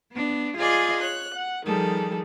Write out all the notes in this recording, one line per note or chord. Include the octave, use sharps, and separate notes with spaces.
B3 D4
F4 G#4 D5 D#5 G#5
C#5 F#6
F#5
D#3 F3 G3 G#4 A4